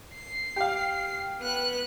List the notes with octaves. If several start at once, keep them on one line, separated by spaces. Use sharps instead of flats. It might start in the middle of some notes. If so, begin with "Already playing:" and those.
C7
G4 F5
B3 F#6